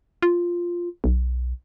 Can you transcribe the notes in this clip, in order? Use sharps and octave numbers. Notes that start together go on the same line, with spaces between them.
F4
B1